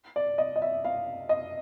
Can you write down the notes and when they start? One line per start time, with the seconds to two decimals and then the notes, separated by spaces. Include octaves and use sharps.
0.16 D5
0.38 D#5
0.56 D#5
0.62 E5
0.85 F5
1.29 D#5